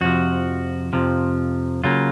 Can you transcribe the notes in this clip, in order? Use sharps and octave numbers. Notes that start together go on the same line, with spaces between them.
F2 C3 F3 F#4
F2 C3 F3
C#3 F#3 A#3 F4